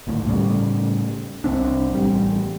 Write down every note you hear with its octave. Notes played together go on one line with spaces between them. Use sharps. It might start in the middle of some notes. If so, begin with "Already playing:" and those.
G#1 D2 A2
A2 C#3 G3
C2 C3 C4 D4
A1 G3